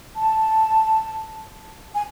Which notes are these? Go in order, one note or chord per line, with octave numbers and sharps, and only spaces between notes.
A5
G#5